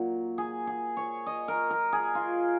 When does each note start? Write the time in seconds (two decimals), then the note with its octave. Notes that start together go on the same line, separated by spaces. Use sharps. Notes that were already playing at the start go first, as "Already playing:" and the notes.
Already playing: A#2 F#3
0.38 G#4
0.67 G#4
0.97 C#5
1.26 D#5
1.48 A#4
1.70 A#4
1.93 G#4
2.15 F4